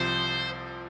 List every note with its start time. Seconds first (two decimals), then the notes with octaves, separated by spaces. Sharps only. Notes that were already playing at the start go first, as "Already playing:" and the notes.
Already playing: C2 C3 F3 C5